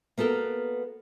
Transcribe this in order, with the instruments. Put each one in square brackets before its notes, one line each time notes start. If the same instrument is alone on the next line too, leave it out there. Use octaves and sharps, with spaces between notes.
[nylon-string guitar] A#3 B3 F#4 A4 A#4